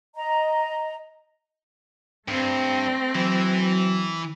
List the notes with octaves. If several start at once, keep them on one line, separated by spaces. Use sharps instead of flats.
D#5 A#5
G2 A3 C4 A#6
E3 F#3